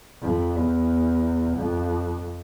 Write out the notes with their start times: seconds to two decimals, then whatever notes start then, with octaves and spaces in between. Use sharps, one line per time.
0.22 F2
0.56 E2
1.57 F2